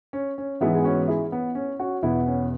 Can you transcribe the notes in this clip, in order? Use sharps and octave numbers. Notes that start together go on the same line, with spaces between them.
C#4
C#4
G#2 E3 G#3 B3 E4
G#4
C#4 F#4
E4 G#4
B3
C#4
C#4 F#4
E2 B2 B3 E4
C#4